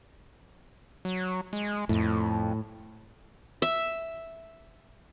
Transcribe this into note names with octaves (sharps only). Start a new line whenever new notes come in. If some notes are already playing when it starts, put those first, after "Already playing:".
F#3
G#3
F2 A2
E5